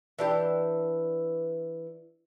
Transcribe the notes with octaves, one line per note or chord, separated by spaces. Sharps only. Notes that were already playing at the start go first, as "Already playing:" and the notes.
E3 D4 G4